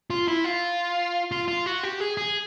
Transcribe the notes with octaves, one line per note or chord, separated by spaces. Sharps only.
F4
E4
F4
F4
F4
F#4
G4
G#4
G#4